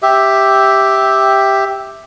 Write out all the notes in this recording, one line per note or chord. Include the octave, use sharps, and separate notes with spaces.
G4 E5